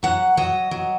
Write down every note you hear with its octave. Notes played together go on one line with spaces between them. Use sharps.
F#3 F#5
F#3 D#5
F#3